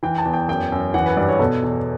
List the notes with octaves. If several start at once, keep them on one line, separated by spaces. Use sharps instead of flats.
E3 G5
A5
E2
G5
F#2 G5
F#2
E3 F#5
B4
G2 D5
C#5
B2 A4
E2